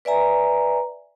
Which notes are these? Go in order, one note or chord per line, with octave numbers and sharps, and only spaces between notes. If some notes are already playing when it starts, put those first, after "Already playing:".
B4 D5 E5 G#5 A#5